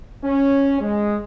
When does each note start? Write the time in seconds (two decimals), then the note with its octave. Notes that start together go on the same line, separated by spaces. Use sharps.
0.24 C#4
0.81 G#3